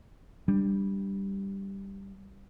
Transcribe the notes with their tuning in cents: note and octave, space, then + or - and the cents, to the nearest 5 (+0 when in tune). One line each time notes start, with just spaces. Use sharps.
G3 +0 D4 +0